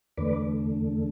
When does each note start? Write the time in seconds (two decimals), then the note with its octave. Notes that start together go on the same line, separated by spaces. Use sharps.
0.17 E2 D3 A3 B4 D5